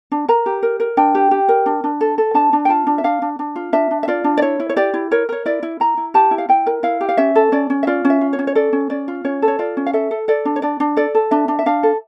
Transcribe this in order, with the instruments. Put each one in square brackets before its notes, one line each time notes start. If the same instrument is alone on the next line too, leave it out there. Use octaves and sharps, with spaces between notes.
[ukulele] D4
A#4 A#5
G4
A#4
A#4
D4 G5
G4
G4
A#4
D4
D4
A4
A4
D4 A5
D4
G5
F4 A5
D4
E5
D4 F5
D4
D4
F4
D4 E5
D4
E5
F4 D5
D4
D5
E4 C#5
E4
C#5
G4 D5
E4
A#4 C#5
A#4 C#5
E4 D5
E4
E4 A#5
E4
G4 A5
E4
F5
E4 G5
A#4
E4 F5
G4
F5
C#4 E5
A4
C#4 D5
C#4
E5
F4 D5
C#4
E5
F4
C#5
C#4
C#5
A4 D5
C#4
C#4 D5
F4
C#4 C#5
A4
C#5
F4 D5
C#4
F5
A4 E5
A4
A4 D5
D4
C#5
D4 D5
D4
A4 D5
A4
D4 E5
D4
E5
D4 F5
A4